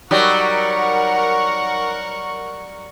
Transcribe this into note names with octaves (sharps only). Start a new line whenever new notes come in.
F#3 G3 D#4 A#4 F#5 C#6